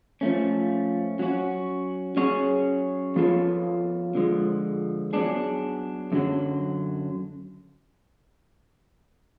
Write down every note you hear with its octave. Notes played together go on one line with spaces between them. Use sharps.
F3 A3 C#4
F#3 C#4 F#4
F#3 C#4 G#4 C#5
F3 B3 F4 A4 C#5
D3 F3 G#3
F#3 B3 D4 G#4
F#2 D3 F#3